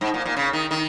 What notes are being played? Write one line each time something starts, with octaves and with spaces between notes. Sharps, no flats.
G#2
A#2
A#2
C#3
D#3
D#3